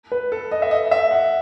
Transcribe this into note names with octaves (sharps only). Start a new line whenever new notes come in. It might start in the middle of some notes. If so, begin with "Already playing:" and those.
B4
A4
D#5
E5
D#5
E5
F#5